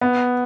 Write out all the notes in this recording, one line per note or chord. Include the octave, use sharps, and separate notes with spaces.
B3